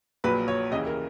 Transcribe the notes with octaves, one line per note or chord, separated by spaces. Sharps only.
A#1 A#2 F#3 B4
C#5
D#2 C#3 E3 D#5
A#4